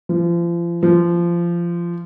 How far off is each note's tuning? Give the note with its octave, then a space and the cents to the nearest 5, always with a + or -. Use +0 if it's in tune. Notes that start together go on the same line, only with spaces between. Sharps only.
F3 -35
F3 -20